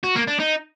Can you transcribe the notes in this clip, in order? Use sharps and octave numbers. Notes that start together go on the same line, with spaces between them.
F#4
A#3
D4
D#4